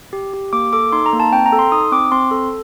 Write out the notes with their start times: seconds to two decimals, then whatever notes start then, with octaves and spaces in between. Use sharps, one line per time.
0.13 G4
0.34 G4
0.53 A#3 D6
0.73 A4 D6
0.93 D#4 C6
1.06 A#5
1.13 A#3
1.20 A5
1.32 C4 G5
1.46 A#5
1.52 A4
1.59 C6
1.72 D#4 D#6
1.92 C4 D6
2.12 C4 C6
2.31 A4